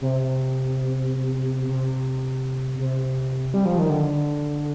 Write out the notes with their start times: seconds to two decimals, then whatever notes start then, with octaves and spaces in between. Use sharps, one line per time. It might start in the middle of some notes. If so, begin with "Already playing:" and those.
0.01 C3
1.68 C3
2.79 C3
3.54 G3
3.65 F3
3.78 D#3
3.90 D3